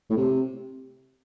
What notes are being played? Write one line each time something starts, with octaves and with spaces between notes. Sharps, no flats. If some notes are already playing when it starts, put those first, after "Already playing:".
A2
C3